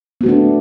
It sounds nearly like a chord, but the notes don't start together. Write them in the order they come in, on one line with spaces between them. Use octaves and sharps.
B3 F#4 A3 D4